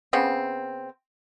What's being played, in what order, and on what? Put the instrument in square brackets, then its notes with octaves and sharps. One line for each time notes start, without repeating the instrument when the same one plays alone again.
[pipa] C#3 B3 C4